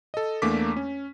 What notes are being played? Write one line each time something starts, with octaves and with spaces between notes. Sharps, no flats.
A4 D#5
E2 A3 A#3 D4 D6 B6
C#4